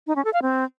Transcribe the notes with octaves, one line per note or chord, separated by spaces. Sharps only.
D#4
C#4
A4
F5
C4